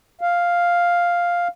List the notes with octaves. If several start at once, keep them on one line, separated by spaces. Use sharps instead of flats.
F5